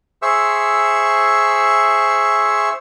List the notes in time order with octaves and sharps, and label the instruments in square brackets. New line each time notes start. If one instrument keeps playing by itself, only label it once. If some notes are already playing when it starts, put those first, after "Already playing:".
[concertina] G#4 C5 E5 C#6 E6